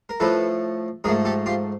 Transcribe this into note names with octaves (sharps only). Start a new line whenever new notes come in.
A#4
A2 F3 A3 A4 B4
G#2 F3 A3 G#4 A#4
G4 A4
F4 G4